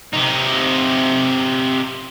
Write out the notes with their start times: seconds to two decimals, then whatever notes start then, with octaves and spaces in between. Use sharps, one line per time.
0.13 C3 D#4